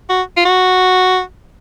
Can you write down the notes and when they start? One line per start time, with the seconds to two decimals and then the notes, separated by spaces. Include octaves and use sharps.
0.09 F#4
0.37 F4
0.45 F#4